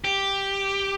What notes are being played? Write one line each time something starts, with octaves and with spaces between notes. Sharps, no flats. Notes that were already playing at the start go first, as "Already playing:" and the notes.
G4